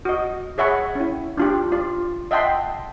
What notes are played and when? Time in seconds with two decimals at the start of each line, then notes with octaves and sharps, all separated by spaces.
0.05 F#4 D#5
0.58 G#4 C#5 E5 F#5 B5 C#6
0.95 C#4 E4
1.37 D4 F4 G4
1.72 F4 D5
2.31 D#5 E5 F#5 G5 A5 C6